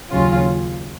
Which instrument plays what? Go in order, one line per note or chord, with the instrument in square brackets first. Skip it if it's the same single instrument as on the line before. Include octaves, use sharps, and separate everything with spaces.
[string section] D#2 C#3 F#3 C#4 F4